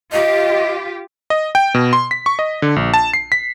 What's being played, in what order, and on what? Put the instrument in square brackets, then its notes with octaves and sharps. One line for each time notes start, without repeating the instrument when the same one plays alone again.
[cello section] F4 G4 [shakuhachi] D#5
[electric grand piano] D#5
G5
B2
C6
B6
C#6
D#5
D3
A#1
A5
C7
B6